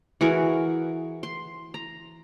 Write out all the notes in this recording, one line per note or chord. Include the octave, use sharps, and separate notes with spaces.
E3 F#4 G#4 A#4
C6
A#5